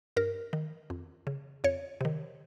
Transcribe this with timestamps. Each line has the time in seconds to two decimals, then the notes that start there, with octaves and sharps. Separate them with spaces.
0.17 G2 A#4
0.53 D#3
0.90 F2
1.27 C#3
1.64 F2 C#5
2.01 C3 D#3